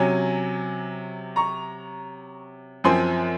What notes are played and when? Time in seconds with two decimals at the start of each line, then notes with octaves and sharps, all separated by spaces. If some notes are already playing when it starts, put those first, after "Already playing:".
Already playing: C3 F#3 C#4 G#5
1.36 A#5 C#6
2.84 F#2 F3 C4 G#5 C6